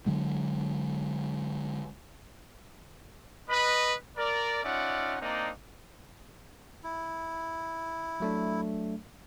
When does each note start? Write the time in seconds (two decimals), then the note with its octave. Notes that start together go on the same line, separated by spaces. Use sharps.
0.06 D3 F#3 G#3
3.49 B4 D#5 B5
4.17 A#4 D5
4.64 C#4 D#4 F4 D5 E5 F#5
5.21 A#3 C4 D4 D#4 D5 D#5
6.84 E4
8.20 F#3 A3 D4